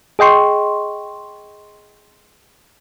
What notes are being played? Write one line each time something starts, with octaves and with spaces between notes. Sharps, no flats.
G#4 D#5 G5 C6 C#6